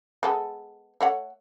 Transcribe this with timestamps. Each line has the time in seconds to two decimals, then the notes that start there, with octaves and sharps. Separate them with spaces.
0.23 G#3 B3 A4
1.01 A3 C#5 F#5